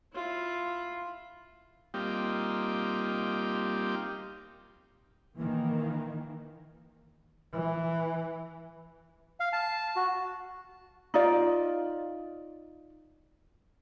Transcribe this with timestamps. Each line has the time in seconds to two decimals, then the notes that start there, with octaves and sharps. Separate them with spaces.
0.13 E4 F4
1.94 G3 A#3 C4 D#4 F4 G4
5.36 D#3 E3 A#3
7.54 E3
9.40 F5
9.53 A5
9.96 F#4
11.14 D#4 F4 D5